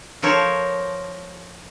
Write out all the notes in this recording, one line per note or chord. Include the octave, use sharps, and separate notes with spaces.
F3 A4 A#4 C5 C#5